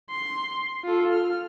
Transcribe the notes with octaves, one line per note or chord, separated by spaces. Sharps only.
C6
F4 A4
F6